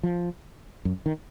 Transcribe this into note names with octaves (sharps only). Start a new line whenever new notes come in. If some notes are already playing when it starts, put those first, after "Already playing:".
F3
F#2
D#3